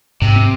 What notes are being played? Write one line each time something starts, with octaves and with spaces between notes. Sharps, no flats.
G#2 C3
C4